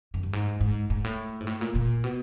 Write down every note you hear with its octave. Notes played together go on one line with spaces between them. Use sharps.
F#2
G2
G#2
G#2
G#2
A2
G#2
A2
A#2
A#2
B2